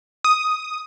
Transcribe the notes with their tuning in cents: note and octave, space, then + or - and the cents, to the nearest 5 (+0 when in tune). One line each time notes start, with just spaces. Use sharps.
D#6 +5